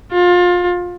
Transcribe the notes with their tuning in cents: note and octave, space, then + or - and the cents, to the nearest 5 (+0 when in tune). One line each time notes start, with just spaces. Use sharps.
F4 +25